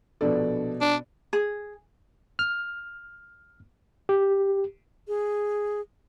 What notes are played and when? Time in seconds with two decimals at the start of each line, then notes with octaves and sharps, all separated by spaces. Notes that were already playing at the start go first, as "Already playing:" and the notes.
0.21 A#1 B2 D4 A4 D5
0.81 D4
1.33 G#4
2.39 F6
4.09 G4
5.08 G#4